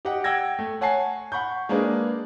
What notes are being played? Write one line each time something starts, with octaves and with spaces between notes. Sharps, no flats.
G4 D#5 F#5 G5
F#5 G5 E6 G#6 A#6
A3
C#5 F#5 G#5 A5 C7
F#5 B5 C#6 G6
G#3 A#3 D4 G#4 B4